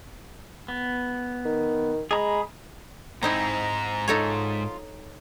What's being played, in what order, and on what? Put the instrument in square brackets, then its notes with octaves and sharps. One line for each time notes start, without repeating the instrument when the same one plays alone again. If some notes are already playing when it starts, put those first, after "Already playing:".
[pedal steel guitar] B3
[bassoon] D#3
[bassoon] G#3 [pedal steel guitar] G#4 A#5 B5
[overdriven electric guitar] G#2 [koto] C4 D#4 E4 [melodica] A#5
[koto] D#4 A4 C#5 [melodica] F4